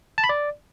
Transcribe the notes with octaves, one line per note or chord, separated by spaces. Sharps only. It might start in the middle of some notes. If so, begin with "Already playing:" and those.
A5
B5
D5